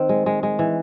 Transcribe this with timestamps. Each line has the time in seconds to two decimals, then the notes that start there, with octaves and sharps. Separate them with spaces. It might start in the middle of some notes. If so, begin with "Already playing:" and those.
Already playing: D#3 C4
0.09 G#3
0.26 G#3
0.43 G#3
0.59 E3